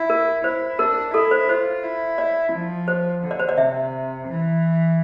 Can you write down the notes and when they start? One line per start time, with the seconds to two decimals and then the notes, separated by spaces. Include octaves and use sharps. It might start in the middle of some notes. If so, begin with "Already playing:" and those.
Already playing: E4
0.10 A#4
0.44 E4 C5
0.79 D4 A#4
1.14 E4 A4
1.31 C5
1.49 F4 C5
1.84 E4
2.18 D5
2.52 F3
2.88 C5
3.23 D3
3.31 D5
3.40 C5
3.49 D5
3.58 C3 E5
4.27 E3